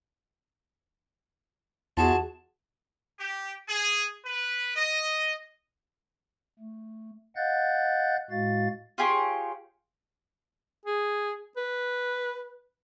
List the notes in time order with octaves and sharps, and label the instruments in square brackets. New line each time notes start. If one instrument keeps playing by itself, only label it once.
[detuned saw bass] E2 [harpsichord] F4 F#4 G#4 [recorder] A5
[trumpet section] G4
G#4
B4
D#5
[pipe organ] A3
D#5 F5 F#5 F#6 G6 A6
A2 G#3 F#4 F5 A6
[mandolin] F4 G4 G#4 C#5
[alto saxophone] G#4
B4